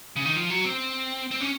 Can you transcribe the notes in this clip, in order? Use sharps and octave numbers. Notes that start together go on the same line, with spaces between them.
C#3
D#3
F3
F#3
C4
C4
C#4